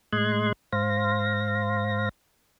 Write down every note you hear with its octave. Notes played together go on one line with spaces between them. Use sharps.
A2 G#3 D#5 C6 F#6 G#6
G#2 C5 F5 A#6